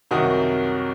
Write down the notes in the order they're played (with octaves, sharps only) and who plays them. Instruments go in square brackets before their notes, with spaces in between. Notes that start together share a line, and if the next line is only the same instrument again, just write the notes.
[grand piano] C2 F#2 D#3 F#4 F#5 D#6